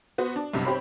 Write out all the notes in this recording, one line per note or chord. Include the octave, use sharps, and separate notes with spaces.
B3 F#4 C5
D4
B1 G2 C3
C4 G4 C#5 B5